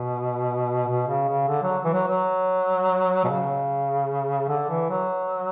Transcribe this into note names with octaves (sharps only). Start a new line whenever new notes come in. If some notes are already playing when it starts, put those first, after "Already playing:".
Already playing: B2
B2
C#3
C#3
D3
F#3
E3
F#3
F#3
B2
C#3
D3
E3
F#3